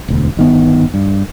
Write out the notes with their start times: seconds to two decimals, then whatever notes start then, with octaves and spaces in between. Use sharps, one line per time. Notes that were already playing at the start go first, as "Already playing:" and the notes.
0.08 E1 D2
0.37 G1 D#3 B3
0.94 G2